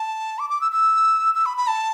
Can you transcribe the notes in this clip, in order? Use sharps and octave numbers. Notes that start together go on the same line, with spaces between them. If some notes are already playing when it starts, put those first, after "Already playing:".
Already playing: A5
D6
D6
E6
E6
E6
B5
B5
A5